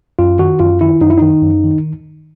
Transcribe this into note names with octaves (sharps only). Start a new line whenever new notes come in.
F#2 F4
D#3 F#4
F#2 F4
D#3 E4
F#2 D#4
E4
D#3 D#4
F#2
D#3